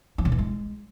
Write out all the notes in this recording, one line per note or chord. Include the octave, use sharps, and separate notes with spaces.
F3
C#3
E3
G#3